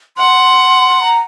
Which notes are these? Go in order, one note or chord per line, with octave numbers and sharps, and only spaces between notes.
F#5 C6
A#5